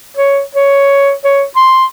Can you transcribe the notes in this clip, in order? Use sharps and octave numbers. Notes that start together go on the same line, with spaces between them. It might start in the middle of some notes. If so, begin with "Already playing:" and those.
C#5
C#5
C#5
C6